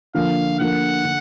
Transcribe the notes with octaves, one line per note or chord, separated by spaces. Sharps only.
D3 F3 A#3 F5
D3 F3 A#3 F#5
D3